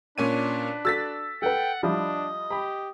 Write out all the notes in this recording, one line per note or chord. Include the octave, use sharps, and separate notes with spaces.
A#2 C#4 D4 B4 D#7
F#4 A4 E6 A6 B6
A4 B4 F#5 G5
F3 G3 D4 E4 D#5
G4 B5